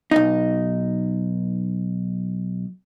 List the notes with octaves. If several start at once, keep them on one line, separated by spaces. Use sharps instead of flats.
B1 D#4